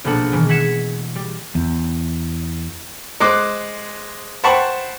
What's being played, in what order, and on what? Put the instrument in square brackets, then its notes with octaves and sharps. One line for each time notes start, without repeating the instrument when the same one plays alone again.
[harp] A#1 B2 B3 D4 A4 F#5
B2 D#3 E3 G#3
E5 F#5 G#6 B6 C#7 E7
G3
[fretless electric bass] E2
[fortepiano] G#3 C5 C6 D6 F#6
C5 F#5 G5 A5 B5 C#6